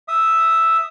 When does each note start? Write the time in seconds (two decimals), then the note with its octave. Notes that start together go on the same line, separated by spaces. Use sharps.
0.08 E5 D#6